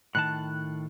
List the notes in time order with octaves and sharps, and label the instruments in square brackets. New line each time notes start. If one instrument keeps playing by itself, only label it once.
[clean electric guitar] A2 D#3 A5 [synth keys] F#6